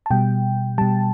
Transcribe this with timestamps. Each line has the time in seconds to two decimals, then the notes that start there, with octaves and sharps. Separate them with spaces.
0.06 A5
0.11 B2 G3 G5
0.78 B2 G3 A5